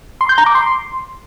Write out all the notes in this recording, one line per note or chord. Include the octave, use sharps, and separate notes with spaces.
C6
G6
A#5
D6
C6